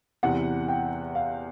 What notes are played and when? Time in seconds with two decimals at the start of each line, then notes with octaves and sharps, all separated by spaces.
0.23 E2 C3 E3 F#5
0.69 G5
1.15 F5